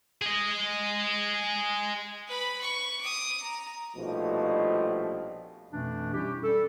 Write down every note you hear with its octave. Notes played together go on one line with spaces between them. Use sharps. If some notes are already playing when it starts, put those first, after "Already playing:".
G#4 D#5
B4 B5
C#6
D6 D#6
A#5
A#1 B2 F3 G3 A3 D#4
F2 B2 E3 A3 C#4 D4
G3 C#4 E4 G4
G3 A4